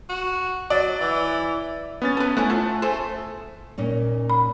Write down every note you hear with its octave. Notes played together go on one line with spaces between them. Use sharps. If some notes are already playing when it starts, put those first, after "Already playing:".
F#4
F#3 D5
E3
B3 C#4 A6
A4 B4
A3 C#4 E4 F#5
F4 A4
A3 G#4 A4 C5
A#2 C#4 D#4
B5